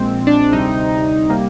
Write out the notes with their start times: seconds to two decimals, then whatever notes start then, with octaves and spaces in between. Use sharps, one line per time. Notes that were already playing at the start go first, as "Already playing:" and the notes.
Already playing: A#1 A#2 G#3 C4
0.27 D4
0.53 D2 C3 G3 C4 D#4
1.30 C3 G3 A#3